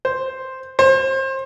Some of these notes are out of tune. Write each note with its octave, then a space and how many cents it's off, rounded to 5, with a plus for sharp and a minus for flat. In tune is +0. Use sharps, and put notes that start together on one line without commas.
C5 +0
C5 +30